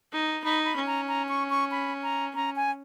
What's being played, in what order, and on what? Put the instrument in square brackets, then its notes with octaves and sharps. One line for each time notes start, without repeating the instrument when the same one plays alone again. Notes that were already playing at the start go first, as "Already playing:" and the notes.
[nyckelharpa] D#4
[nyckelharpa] D#4 [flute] B5
[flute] B5
[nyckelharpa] C#4
[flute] A#5
A#5
C#6
C#6
B5
A#5
[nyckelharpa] C#4 [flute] A#5
[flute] G#5